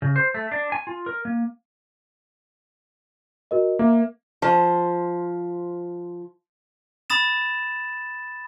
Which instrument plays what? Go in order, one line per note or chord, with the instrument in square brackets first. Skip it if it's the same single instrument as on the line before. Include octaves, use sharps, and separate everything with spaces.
[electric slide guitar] C#3
C5
A3
D4
G#5
F4
A#4
A#3
[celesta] F#4 A#4 D#5
[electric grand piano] A#3 [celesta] E5
[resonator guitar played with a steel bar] F3 C5
[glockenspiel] B5 D#6 A6 E7